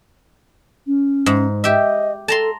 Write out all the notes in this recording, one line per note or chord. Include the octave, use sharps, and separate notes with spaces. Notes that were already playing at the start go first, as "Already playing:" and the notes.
C#4
G#2
G4 D#5 E5
A4 A5 A#5 C6